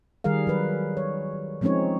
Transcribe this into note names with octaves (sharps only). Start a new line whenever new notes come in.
D#3 G3 G#4 A#4 F5
F#3 B4
C#5
F3 G#3 C4 C#4 D#4 C#5